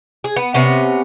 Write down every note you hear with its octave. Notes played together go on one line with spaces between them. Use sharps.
G#4
B3
C3 B3 C#4